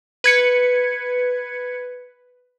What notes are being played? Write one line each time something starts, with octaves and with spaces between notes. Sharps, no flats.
B4 G#6 C#7